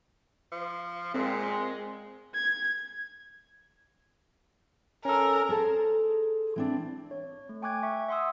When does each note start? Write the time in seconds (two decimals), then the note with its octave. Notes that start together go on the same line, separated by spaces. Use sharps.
0.52 F3
1.14 A#2 G#3 C4
2.35 G#6
5.05 C#4 A4 A#4
5.49 G#4 A4 C5 A5
6.56 E3 C4 D4
7.11 C#5
7.49 A3
7.62 G5 G#5 C#6 D6 F#6 G#6
7.83 E5 C#6
8.08 E5 F#5 C6 C#6 D#6 E6